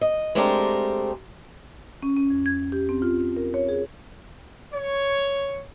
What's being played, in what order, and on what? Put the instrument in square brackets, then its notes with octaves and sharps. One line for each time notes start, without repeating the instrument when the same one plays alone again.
[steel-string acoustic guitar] D#5
G#3 A3 C4 D4 G4 A#4
[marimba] C#4
C#4
F2
G#6
G4
C4
F4
A#4
C#5
G#4
[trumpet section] C#5